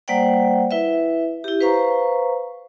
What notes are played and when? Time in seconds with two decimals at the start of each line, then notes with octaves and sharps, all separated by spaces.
0.08 G3 A#3 C5 D5 F#5 G5
0.71 E4 B4 E5
1.44 E4 G4
1.61 B4 C5 F5 A#5 C#6